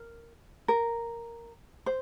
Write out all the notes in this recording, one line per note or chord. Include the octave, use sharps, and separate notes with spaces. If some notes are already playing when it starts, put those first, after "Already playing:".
Already playing: A#4
A#4
C5